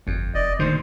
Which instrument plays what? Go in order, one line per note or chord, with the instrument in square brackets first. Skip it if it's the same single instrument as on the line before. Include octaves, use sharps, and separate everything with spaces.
[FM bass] G1 [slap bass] F2
[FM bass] F1 [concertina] D5 D#5
[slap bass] D2 A#2 D3 [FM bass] D#3 [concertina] C5